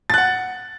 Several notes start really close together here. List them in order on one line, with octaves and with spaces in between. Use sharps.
A6 F#6 F#5